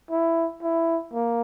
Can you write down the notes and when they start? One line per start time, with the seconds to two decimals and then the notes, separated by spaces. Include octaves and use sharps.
0.11 E4
0.62 E4
1.13 A#3